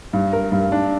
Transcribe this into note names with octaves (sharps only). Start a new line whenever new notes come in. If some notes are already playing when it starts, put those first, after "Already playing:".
G2
A#4
G2
D4